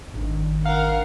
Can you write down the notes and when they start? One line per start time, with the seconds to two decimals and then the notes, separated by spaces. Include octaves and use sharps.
0.14 G#1 D#3 D4
0.65 A#4 F5 F#5